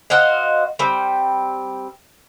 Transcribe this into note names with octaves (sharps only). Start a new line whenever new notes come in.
F#4 C5 D#5 F5
G3 C4